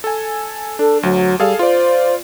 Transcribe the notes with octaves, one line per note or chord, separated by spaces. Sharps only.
A4 G#5
D4 A4
D2 F#3
G3 G#4 A4 F5
F4 C5 D5